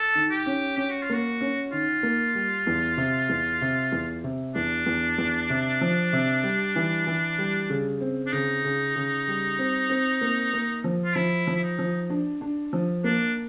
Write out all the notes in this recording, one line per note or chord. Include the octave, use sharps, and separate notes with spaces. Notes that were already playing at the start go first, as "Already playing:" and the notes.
Already playing: A4
D#3
G4
C#4
C#4 G4
F#4
F4
A#3 F#4
C#4
D#3 F4
A#3
G3
E2
C3
E2
C3
E2
C3
E2 D4
E2
E2
C3
F3
C3
G3
E3
E3
G3
C#3
C4
D4
C#3 D#4
C#3
C#3
G3
C4
C4
A#3
A#3
F3
F4
F3 E4
F3
E4
D#4
F3
D4
D4
F3
A#3 D4